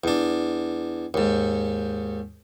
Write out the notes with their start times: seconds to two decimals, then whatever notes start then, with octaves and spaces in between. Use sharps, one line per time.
0.04 E2 D4
1.14 D#2 G#2